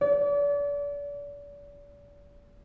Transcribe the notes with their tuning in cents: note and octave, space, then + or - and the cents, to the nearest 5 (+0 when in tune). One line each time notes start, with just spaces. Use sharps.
D5 -35